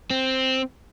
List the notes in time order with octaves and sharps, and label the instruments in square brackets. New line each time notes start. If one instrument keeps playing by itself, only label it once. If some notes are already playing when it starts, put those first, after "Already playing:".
[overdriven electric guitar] C4